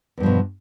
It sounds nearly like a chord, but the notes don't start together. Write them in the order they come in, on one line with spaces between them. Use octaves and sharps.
E2 G2 F3 B2